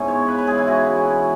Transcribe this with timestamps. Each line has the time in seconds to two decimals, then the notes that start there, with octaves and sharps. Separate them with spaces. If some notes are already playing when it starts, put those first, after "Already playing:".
Already playing: G#2 B3 C#4 E4
0.08 G#3 C#5
0.28 C#3 B4
0.38 B4
0.47 E3 G#3 G#4
0.58 E4
0.67 C#3 F#4
0.86 E3 G#3
1.06 B2